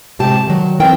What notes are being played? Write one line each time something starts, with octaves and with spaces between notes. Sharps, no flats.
A2 C3 G#3 G4 A5
D#3 F#3
E3 C4 E4 A#4 G5